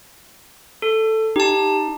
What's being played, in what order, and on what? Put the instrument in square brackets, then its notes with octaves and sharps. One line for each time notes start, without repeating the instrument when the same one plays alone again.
[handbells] A4
[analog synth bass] D#4 [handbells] G4 A5